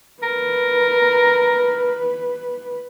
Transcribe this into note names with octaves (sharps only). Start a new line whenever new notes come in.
A#4 B4